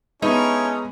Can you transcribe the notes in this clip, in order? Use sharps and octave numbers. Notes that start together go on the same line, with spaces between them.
G#3 B3 C#4 D#4 E4 A4 C#5